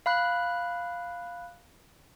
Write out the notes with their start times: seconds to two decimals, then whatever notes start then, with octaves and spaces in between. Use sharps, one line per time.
0.06 F5 B5 F#6